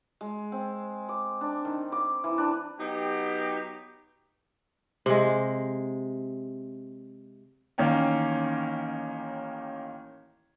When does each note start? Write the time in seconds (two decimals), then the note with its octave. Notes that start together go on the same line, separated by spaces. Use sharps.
0.21 G#3
0.52 C4
1.09 D6
1.41 D4
1.65 D#3
1.92 D6
2.24 E3
2.38 D4
2.79 F#3 B3 D#4 G4
5.06 C3 G#3
7.78 A1 D#3 A#3 C#4 C#5 G5